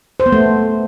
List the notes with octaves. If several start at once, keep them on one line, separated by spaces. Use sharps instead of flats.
C5
B3
A3